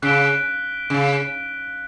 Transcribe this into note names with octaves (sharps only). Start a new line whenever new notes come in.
C#3 F#6 B6 D7 G7
C#3